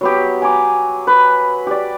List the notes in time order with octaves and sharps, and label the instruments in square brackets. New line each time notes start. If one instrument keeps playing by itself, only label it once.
[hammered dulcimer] F#3 B3 G4
G#5 A#5 D6
B4
G4 D5